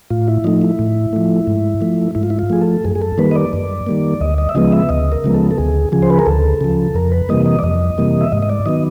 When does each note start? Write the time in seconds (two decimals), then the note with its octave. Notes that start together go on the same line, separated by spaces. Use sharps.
0.10 A2 F4
0.28 E4
0.44 F3 A3 D#4
0.62 E4
0.79 A2
1.13 F3 A3
1.47 G#2
1.81 F3 A3
2.15 G#2 E4
2.23 F4
2.30 E4
2.39 F4
2.50 F3 A3 G#4
2.61 A4
2.84 F#2 G#4
2.95 G#4
3.02 A4
3.18 D#3 G3 A#3 B4
3.31 D#5
3.35 D5
3.53 F#2
3.87 D#3 G3 A#3
4.20 D2 D#5
4.38 D#5
4.49 E5
4.55 C#3 F3 G#3 B3 D#5
4.72 E5
4.89 D2 D#5
5.12 A#4
5.24 C#3 F3 G#3 B3
5.35 A4
5.51 A4
5.58 D2 G#4
5.92 C#3 F3 G#4
6.03 C5
6.10 B4
6.19 A#4
6.26 D2 A4
6.61 C#3 F3
6.94 F2 A#4
7.12 B4
7.29 C3 E3 G3 A#3 D#5
7.46 D#5
7.59 D5
7.63 F2 D#5
7.98 C3 E3 G3 A#3
8.21 E5
8.32 G#2 D#5
8.42 D#5
8.50 D5
8.66 D#3 F#3 B3 D#5